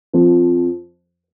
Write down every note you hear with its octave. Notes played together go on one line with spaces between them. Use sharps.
F2 F3